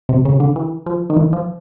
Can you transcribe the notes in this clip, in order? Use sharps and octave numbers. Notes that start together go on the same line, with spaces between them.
C3
C#3
D3
E3
F3
D#3
E3
F3